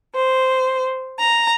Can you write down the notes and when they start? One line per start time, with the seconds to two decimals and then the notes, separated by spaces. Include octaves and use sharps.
0.14 C5
1.18 A#5